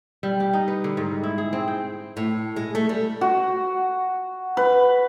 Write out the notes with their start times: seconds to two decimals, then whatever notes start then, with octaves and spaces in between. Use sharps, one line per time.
0.23 G3
0.40 G4
0.53 D#4
0.68 B4
0.84 D3
0.97 G#2
1.24 E4
1.38 G#4
1.53 C4
1.68 G5
2.17 A2
2.56 G#3
2.75 A3
2.89 G3
3.21 F#4
4.57 B4